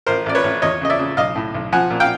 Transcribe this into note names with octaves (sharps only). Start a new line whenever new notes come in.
A1 A#4 C5
A1 D5
B4 C#5
A1
E2 C#5 D#5
C#3 D#5
D5 E5
C#3
B1 D#5 F5
A2
B1
F3 F#5 G#5
A#2
F5 G5